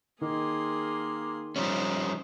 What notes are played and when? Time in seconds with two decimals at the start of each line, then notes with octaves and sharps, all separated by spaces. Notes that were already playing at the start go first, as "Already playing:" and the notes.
0.21 D#3 A#3 G#4 C6
1.56 F3 G3 C#4 D#4 C5